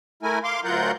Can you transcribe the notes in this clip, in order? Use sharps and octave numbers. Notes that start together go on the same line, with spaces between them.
A3 E4 A#4 G#5
F5 C6 D6
D2 F#3 F4 A#4 F#5 G6